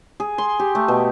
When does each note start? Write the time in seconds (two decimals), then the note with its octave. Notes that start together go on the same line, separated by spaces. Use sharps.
0.20 G#4
0.38 C6
0.59 G4
0.75 A3
0.88 B2